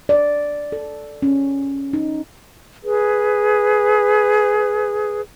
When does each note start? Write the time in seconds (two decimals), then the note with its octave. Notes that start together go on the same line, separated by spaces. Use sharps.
0.09 D5
0.72 A4
1.22 C#4
1.93 D#4
2.83 G#4 B4